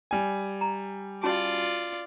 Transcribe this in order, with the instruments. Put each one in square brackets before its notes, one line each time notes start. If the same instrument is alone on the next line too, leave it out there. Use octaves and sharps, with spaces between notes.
[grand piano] G3 G#5
[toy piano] A#5
[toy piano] C#4 F#4 A5 [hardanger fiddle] F4 D5